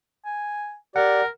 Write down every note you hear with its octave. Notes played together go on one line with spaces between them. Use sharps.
G#5
G4 A#4 D5 F#5